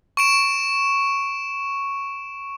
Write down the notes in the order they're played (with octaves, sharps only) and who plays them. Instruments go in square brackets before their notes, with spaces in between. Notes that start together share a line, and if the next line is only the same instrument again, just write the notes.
[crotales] C#6 D7 E7